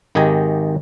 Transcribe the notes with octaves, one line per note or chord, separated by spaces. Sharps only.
G#1 D#3 G4 G#4 G#5 A#5